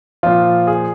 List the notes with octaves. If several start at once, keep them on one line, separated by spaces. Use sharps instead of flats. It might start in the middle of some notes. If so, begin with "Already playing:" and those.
A#2 F3 F4
G#4